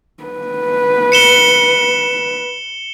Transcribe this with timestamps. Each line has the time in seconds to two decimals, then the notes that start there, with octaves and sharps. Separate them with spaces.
0.24 B4
1.12 C#7 E7 G7